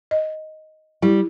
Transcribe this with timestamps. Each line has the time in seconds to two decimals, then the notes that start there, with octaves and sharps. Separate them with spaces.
0.11 D#5
1.02 G3 E4